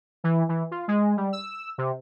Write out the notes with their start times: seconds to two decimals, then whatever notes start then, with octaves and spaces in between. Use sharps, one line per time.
0.24 E3
0.49 E3
0.71 F4
0.88 G#3
1.17 G3
1.33 E6
1.78 C3